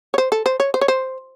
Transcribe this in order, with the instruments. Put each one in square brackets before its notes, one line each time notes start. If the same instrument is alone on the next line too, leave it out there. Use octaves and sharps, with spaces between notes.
[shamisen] C#5
C5
A4
C5
C#5
C5
C#5
C5